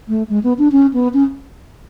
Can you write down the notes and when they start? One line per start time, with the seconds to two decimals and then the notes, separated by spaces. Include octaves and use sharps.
0.08 A3
0.29 G#3
0.44 B3
0.58 D4
0.72 C#4
0.94 B3
1.14 C#4